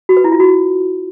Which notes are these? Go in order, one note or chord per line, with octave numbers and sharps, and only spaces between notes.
F#4
B4
E4
F4
F#4